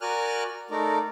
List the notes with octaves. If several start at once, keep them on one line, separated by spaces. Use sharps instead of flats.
F#4 A#4 D5 G#5 F6 F#6
A3 D#4 A#4 D5